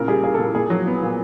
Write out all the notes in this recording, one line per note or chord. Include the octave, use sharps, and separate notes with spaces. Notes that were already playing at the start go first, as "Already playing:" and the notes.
Already playing: A#2 C#3 A#4
G3 G#4
A#3 G#4
A4
A#2
A#2 G#4
F#3
B3
A#2